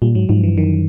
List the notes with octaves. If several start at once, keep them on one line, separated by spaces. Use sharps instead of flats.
A#2 G3
G#2 F#3
G#2 F3
G2 E3
F#2 D#3